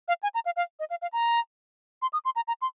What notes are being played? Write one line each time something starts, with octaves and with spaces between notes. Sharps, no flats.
F5
G#5
A#5
F5
F5
D#5
F5
F5
A#5
C6
D#6
C6
A#5
A#5
C6